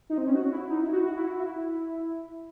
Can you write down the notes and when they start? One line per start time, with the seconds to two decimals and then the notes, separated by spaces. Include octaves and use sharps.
0.10 D#4
0.18 C4
0.27 C#4
0.35 F#4
0.52 E4
0.70 D#4
0.82 E4
0.93 F#4
1.05 F#4
1.16 E4
1.27 F#4
1.39 E4